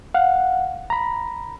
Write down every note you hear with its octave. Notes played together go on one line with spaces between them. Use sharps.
F5 F#5
A#5 B5